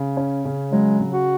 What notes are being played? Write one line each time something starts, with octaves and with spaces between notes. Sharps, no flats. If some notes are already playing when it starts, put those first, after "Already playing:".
Already playing: C#3
C#4
C#3
F#3 G#3
C#3
F#4